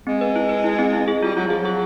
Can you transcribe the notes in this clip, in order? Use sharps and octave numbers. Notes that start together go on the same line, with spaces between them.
G#3 C4
B4
E4
B4
E4
C4
E4
G#4
G3 F4
F#3 F4
F3 G#4
F#3
G#4